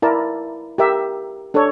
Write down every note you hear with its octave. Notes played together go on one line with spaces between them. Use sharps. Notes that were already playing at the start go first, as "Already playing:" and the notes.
E4 A#4 D5 A5
G4 A#4 E5
D4 A4 C#5